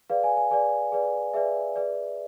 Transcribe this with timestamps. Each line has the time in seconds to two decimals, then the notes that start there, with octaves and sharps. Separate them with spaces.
0.10 G#4 B4 D5 F5
0.24 G#5
0.37 G#5
0.51 G#4 B4 D5 G#5
0.92 G#4 B4 D5
1.34 G#4 B4 D5 E5
1.76 G#4 B4 D5